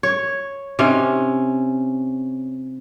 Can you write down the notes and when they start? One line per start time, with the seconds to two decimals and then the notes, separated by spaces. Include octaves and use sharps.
0.03 C#5
0.79 C3 C#4 D#4